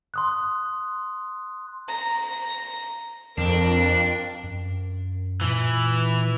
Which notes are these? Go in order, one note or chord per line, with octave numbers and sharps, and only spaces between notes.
C6 D#6 F#6
A#5
F2 D4 A#4
F#2
A#2 E3